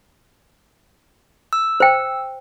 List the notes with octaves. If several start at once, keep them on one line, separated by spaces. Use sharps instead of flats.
E6
C5 G5